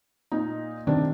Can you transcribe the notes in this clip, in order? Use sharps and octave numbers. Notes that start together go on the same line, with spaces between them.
A#2 D#4
C3 D#3 D4